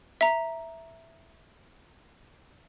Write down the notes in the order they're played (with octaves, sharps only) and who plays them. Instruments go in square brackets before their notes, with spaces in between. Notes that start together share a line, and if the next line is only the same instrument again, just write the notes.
[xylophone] E5 A#5